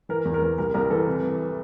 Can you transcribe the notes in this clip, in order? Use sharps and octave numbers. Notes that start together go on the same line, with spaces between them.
E3 A#4
E2
A#4
E3
C2 A#4
C2 A#4
E3 A4
C3
E3